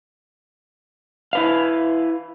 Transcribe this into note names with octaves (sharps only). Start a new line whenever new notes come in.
E4 B4 F5